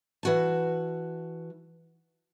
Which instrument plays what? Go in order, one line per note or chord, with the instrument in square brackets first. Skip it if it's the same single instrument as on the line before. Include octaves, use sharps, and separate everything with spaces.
[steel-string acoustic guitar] E3 F#4 A5